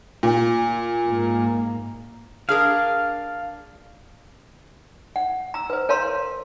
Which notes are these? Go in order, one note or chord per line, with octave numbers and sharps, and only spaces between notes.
A#2
G#2 A#3
D4 G#4 A#4 F5
F#5
A#5 E6
B4 C5
A#4 C#5 F5 A#5 C6